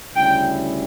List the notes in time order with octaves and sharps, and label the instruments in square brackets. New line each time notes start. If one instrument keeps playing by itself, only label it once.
[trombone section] D2 C#3 G3 C#4 E4 [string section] G5